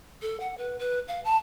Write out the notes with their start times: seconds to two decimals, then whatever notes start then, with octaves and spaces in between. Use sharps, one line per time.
0.22 A4
0.40 F#5
0.58 B4
0.79 B4
1.08 F5
1.25 A5